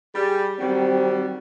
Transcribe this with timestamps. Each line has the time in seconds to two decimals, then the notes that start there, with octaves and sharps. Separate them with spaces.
0.15 G3 G#4
0.59 D#3 F#3 G3 C4